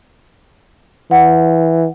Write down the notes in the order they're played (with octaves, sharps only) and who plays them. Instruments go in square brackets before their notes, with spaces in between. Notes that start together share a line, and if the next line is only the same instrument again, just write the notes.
[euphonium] E3 [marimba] F#5